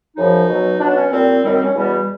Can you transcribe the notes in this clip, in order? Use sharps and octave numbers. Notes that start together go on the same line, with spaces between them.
F#2 C#3 F3 D#4
B2 F#3
B2 D4
F#3
D4
C#4
A#2 G3 C4
F#2 D#3 G3 C4
C4
C#4
E2 B2 G3